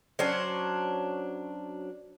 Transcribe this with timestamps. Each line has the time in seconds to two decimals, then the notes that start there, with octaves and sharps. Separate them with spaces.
0.19 F#3 C#4 D4 C5